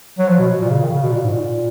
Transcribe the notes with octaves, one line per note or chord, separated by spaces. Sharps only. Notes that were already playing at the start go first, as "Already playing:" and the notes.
F#3
F3
B2
A#2
C#3
D#3
C#3
B2
A#2
G#2
A#2